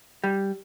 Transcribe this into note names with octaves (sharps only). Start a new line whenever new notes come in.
G3